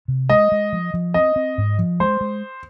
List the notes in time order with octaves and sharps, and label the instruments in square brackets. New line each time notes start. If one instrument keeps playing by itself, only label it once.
[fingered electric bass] C3
[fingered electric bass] G#3 [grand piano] D#5
[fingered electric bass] G#3
F3
F3
[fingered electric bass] C4 [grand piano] D#5
[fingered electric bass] C4
G#2
F3
[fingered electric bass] G#3 [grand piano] C5
[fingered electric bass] G#3